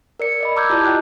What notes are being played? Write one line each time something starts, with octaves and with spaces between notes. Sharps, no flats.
A#4 D5 C#7
D5 D#5 B5
A#5 D6 E6 F6 G6 G#6
E4 F4 G4 D5 A5
D#5 G5 F#6